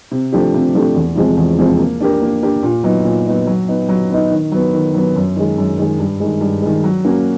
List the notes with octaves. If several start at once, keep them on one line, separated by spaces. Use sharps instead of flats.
C3
F3 A3 D4 G4
C3
F3 A3 D4 G4
E2
C3 F3 G#3 C4
E2
C3 F3 G#3 C4
A#3
D4 G4 A#4
A#3
D4 G4 A#4
A#2
F#3 B3 D#4
A#2
F#3 B3 D#4
F#3
B3 D#4
F#3
B3 D#4
D#3
F#3 B3
D#3
F#3 B3
F#2
D#3 G#3
F#2
D#3 G#3
G2
D#3 G#3
G2
D#3 G#3
F#3
A#3 C#4 F#4